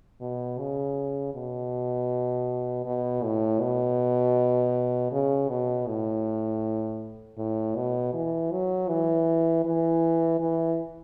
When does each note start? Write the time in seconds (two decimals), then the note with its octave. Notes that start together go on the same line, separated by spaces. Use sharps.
0.21 B2
0.59 C#3
1.34 B2
2.85 B2
3.23 A2
3.61 B2
5.12 C#3
5.49 B2
5.87 A2
7.38 A2
7.76 B2
8.14 E3
8.52 F#3
8.89 E3
9.65 E3
10.40 E3